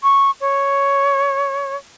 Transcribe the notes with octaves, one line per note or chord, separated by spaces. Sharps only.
C#6
C#5